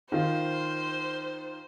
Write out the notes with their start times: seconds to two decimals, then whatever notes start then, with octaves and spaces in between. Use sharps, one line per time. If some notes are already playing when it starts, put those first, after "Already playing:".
0.12 D#3 F4 C5